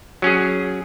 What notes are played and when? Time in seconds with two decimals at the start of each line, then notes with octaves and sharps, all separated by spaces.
0.22 F#3 C#4 G#4